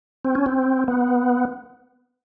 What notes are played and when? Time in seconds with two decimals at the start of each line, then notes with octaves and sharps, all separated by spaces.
0.25 C4
0.35 C#4
0.46 C4
0.88 B3